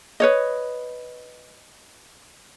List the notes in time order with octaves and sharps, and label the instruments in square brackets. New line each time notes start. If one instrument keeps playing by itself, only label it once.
[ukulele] B4 C#5 D#5